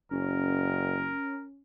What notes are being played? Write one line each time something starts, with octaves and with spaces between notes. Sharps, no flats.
F#1 C#4 A#4